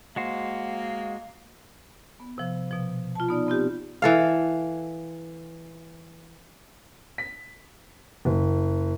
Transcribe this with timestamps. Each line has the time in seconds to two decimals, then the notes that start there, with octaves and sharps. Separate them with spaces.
0.16 G#3 A#3 F#4 C5
2.20 B3
2.38 C3 F3
2.71 B2 F3
3.15 F4 A5
3.29 B3 D#4 D5
3.47 B3 C4 F4 G4
4.02 E3 A4 F5
7.18 B6
8.25 F#1